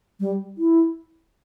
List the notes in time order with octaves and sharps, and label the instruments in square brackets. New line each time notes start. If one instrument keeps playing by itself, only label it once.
[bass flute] G3
E4